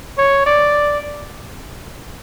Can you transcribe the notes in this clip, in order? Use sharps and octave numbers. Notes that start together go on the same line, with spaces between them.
C#5
D5